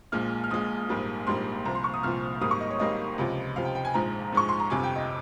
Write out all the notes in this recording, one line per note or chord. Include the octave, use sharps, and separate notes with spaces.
A#1 A#2 G#3 F6
F6
A#1 A#2 G#3 D#6
A#1 G#2 G3 A#3
A#1 G#2 G3 A#3 C6
C2 A#2 F3 A#5
C6
C#6
D#6
C2 A#2 F3 F6
G#1 G#2 G3 A#3 D#6
C#6
D#5
C#5
G#1 G#2 G3 A#3 D#5
C#2 C3 F3
C#2 C3 F3 F5
G5
G5
G#5
A#1 G#2 F3 G#3 A#5
A#1 G#2 F3 G#3 C#6
C6
A#5
G1 F2 C3 G#5
G5
D#5